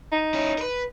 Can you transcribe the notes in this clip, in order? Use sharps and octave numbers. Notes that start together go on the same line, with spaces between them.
D#4
C#4 E4
A#4 B4